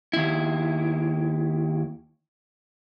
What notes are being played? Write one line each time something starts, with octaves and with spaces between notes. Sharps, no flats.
D#2 E4